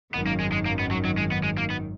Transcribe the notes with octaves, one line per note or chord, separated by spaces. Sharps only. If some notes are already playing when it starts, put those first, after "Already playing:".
G#1 F#2 D#3 B3
A#3
G#3
G#3
A#3
B3
F#3
F#3
G#3
B3
G#3
A#3
B3